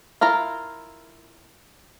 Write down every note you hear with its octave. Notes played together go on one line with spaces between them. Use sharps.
E4 F4 A#4 A#5